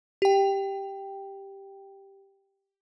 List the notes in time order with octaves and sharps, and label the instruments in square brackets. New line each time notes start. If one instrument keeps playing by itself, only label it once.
[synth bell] G4 G5